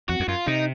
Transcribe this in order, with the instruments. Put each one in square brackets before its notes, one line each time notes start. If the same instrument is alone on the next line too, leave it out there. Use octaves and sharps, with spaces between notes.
[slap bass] F2 [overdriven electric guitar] F#4
[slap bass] F2
[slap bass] F#2 [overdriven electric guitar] F4
[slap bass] C3 [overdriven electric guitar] D#4